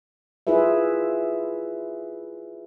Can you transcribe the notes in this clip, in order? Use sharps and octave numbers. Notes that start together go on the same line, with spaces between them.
E4 F4 G#4 B4 E5